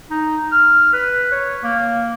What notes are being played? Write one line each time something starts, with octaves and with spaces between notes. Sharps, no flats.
D#4
F6
B4
C#5
A#3